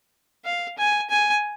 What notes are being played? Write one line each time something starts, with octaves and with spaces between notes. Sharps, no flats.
F5
G#5
G#5